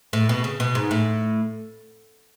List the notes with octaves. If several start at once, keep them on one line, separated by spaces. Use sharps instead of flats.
A2
B2
C#3
B2
G#2
A2